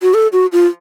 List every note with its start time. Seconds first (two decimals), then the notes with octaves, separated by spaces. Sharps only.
0.02 F#4
0.14 A4
0.33 F#4
0.52 F4